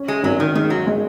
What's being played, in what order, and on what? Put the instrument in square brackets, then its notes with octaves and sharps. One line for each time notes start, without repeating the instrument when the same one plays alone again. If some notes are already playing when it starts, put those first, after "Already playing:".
Already playing: [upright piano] C#4
[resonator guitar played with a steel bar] G#3
[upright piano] G#1 [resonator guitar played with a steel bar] F#3
[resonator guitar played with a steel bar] D#3
[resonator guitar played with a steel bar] D#3 [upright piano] G#3
[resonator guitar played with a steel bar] F#3
[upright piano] G#3